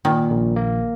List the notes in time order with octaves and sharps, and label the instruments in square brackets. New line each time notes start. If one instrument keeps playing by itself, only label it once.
[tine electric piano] A#2 [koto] D#3
[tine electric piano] A#1
A#3